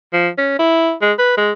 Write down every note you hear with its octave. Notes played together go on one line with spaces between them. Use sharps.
F3
C#4
E4
G#3
B4
G#3